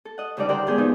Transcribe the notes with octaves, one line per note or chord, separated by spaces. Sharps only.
A4
D#5 F#5
D2 C#3 G3 D#4 D5 A5
G4 A#4 C5 D5 F#5 G5
E2 G#2 B3 G#4 G6
F3 B3 D#4 F4